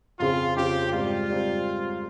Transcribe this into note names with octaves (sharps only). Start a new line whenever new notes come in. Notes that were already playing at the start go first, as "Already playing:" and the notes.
F2 C#3 F3 C4 F4
F2 C#3 F3 C4 G4
G#2 G3 C4 F4
G3 C4